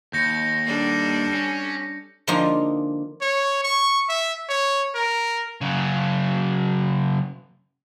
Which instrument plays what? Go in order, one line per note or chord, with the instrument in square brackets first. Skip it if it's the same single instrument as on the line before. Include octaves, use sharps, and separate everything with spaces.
[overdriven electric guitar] D#2 [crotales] G6 A#6 C#7
[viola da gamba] G3 D4 A4
[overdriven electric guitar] C#4
[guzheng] D3 F3 G#3 A#3 D#4 F4
[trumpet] C#5
C#6
E5
C#5
A#4
[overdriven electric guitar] C#3 F#3